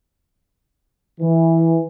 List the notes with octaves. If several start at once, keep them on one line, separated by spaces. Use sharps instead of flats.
E3